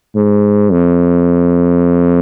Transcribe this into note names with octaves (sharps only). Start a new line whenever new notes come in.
G#2
F2